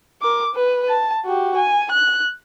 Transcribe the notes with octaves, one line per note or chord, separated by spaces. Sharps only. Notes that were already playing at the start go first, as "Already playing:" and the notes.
A#4 D6
B4
A5
F#4 G4
G#5
F#6